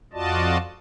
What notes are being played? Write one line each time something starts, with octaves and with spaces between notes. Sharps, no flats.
F2 F4 F#4 D5 D#5 A5